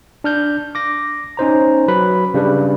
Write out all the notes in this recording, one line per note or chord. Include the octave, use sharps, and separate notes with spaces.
D4 F6 G6
D6 A#6
C#4 D#4 C5 A#5
F#3 B4 B5
C#3 G3 D4 B4